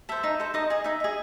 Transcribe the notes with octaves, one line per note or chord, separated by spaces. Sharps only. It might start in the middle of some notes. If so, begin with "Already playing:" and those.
A4 C5 E5
D#4
A4 C5
D#4 D#5
G#4 D#5
D#4 E5
G#4 D#5